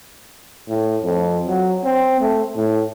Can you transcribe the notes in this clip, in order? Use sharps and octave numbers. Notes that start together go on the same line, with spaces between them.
A2
F2
F#3
C4
A3
A2